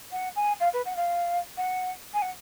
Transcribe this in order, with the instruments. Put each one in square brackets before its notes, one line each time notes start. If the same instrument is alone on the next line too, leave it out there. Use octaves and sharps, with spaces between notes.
[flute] F#5
G#5
F5
B4
F#5
F5
F#5
G#5
F#5